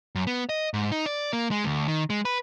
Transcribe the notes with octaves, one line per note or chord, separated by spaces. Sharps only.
F#2
B3
D#5
G#2
D#4
D5
A#3
G#3
D2
D#3
G#3
B4